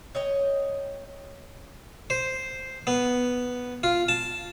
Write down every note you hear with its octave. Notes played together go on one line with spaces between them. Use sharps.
C#5 D#5 G5
C5
B3
F4
A5